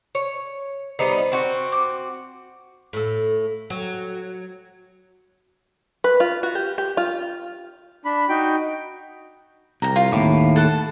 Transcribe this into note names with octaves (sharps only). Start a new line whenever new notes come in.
C#5
G3 B3 D#4 C5
C4 F#4
D6
A2 A4
F#3
B4
F4
F#4
G4
G4
F4
D4 B5
D#4 F#4 G5
C2 G5 A#5
F4
D#2 A2 D6
A4 F#5 A5